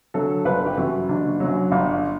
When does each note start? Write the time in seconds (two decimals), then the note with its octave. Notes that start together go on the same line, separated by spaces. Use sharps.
0.14 D3 F#3 A4
0.45 G1 B4
0.66 G4
0.77 F#2 E3 F#4
1.09 F#1 D4
1.40 F#2 F#3
1.72 G1